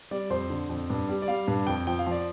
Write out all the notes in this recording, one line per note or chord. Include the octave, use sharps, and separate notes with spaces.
G3 D5
F2 C5
D3
F2
G2
G3
D5
G3 F5
G2
F2 G5
F3 G5
F5
F3 D5